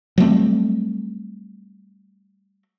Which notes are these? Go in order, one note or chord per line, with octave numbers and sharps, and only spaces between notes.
F#3 G3 A3 C4